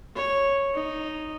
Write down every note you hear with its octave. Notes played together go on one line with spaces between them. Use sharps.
C#5
D#4